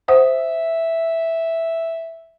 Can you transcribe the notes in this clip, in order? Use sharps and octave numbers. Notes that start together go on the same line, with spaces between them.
C5 E5 F#5 D#6